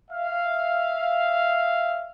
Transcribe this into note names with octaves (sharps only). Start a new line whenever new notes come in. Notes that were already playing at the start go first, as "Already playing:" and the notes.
E5 F5